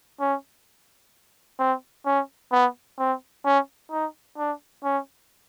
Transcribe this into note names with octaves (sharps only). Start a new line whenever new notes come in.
C#4
C4
C#4
B3
C4
C#4
D#4
D4
C#4